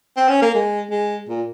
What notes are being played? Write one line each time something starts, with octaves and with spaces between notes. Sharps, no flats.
C4
C#4
A#3
G#3
G#3
A#2